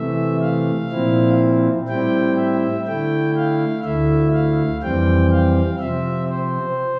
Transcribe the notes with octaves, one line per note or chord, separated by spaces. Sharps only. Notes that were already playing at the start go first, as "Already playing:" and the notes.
Already playing: C3 E3 A3 E5
F5
A#2 F3 C4 E4
A2 G3 C4 E4 G5
E5
D3 A3 E4 G5
F5
D2 D3 A3 E4 E5
F5
F2 E3 G3 C4 G5
F5
C3 F3 C4 E5
C5